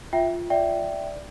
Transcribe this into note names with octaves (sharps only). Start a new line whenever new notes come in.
F4 E5 G5
D5 E5 G5